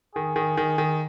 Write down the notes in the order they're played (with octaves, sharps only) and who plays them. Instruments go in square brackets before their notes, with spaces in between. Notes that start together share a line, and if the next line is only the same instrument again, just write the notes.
[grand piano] D#3 [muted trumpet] G#4
[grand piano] D#3
D#3
D#3